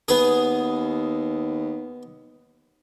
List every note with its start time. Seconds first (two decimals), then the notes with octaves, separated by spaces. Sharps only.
0.08 D#2 B3 G#4